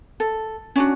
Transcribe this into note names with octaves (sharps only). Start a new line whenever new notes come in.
A4
C#4 D4 F#4